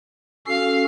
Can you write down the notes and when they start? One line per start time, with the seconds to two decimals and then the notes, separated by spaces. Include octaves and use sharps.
0.47 C#4 F#4 A4 F5 C7